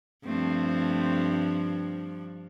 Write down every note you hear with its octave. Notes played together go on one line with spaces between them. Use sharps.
G2 F3 A3 C4